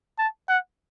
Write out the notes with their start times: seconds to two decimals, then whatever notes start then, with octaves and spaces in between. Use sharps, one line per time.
0.19 A5
0.49 F#5